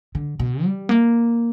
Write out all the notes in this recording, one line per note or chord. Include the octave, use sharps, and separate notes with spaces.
D3
B2
G3
A#3